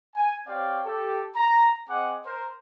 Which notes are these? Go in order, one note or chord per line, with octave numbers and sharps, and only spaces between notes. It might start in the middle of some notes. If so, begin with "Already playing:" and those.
G#5
C4 G4 C#5 D5 F5 G5
G4 A4
A#5
C4 G#4 D#5 F#5 G#5 D6
A#4 C5